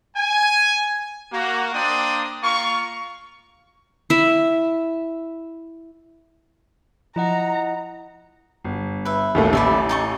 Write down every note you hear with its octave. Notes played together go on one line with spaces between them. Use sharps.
G#5
A#3 F#4
A#3 D4 C5 D5 G5 D#6
A#3 F4 F5 C#6
E4 E5
F3 E4 D#5 F#5 A#5
G1
B4 E5
A1 D#2 A3
A1 B4 D5 E5
D#4 A4 C#6